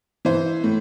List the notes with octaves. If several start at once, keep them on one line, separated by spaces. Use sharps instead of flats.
E3 C5
A2